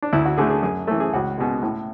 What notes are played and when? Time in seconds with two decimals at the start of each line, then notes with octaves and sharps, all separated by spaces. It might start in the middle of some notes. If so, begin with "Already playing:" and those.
0.02 D4
0.13 D2 E4
0.25 F#4
0.37 D3 A3 G#4
0.50 G#4
0.63 F#2 G#4
0.87 E3 A3 A4
1.00 G#4
1.13 C#2 F#4
1.38 B2 G#3
1.63 A2